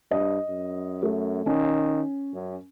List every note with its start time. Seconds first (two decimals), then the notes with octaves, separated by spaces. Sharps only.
0.11 G2 D#5
0.49 F#2
1.03 A3
1.46 D#3 C#4
2.34 F#2